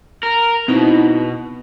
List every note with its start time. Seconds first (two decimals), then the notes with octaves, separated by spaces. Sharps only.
0.23 A#4
0.68 B2 C4 D#4 E4